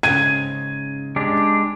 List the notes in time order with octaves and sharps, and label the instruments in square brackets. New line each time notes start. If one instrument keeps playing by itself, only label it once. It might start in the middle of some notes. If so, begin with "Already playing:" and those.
[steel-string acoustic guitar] G#2 C#3 [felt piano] G#6 D#7
[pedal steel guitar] G#3 D4 G4